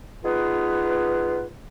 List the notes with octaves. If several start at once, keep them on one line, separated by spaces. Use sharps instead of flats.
B3 D#4 F4 G#4 B4